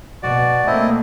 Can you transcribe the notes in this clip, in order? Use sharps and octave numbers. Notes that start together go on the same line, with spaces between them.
B2 F#4 D5
A3 A#3 C4 E4 D#5